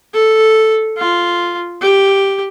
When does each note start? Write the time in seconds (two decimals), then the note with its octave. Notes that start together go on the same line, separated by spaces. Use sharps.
0.14 A4
0.98 F4
1.81 G4